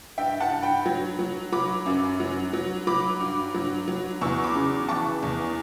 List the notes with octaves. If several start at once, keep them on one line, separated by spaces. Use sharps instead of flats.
G2 E5 G5
F#5 A5
G2
G5 B5
F#3
F#3
F#3 B5 D6
F#2
F#3
F#3
F#3 B5 D6
G2
F#3
F#3
E2 C#6 E6
B5 D6
C#3
E3 A5 C#6
E2